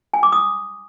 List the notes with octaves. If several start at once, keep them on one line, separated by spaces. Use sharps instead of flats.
G#5
D6
D#6